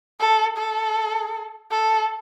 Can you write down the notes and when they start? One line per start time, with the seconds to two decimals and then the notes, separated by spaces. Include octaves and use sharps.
0.20 A4
0.57 A4
1.72 A4